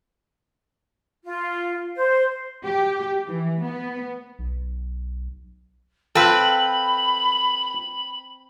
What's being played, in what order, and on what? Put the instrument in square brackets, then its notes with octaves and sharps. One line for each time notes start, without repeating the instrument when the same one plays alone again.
[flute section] F4
C5
[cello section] G4
E3
B3
[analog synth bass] B1
[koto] C4 B4 [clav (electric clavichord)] F4 A4 [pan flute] B5